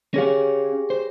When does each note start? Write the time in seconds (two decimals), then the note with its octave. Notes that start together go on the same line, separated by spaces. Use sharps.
0.14 C#4 G4 G#4 C#5 F5 A#6
0.90 C5